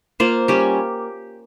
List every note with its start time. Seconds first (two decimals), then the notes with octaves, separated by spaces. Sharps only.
0.20 A#3 F4 C5
0.48 G3 C#4 G4